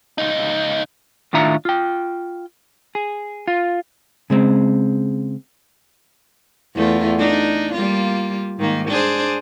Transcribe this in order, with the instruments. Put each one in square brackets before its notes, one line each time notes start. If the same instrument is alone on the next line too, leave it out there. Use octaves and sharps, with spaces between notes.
[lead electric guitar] C#2 D#4
[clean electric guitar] A2 D#3 D4 F4 E5 A#5
F4 G5
G#4
F4
[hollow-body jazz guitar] C#3 G#3 C4
[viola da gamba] E2 A3 F4
D4 D#4
G3 A#3 F4
G#2 D#3 A#3
D4 G#4 C5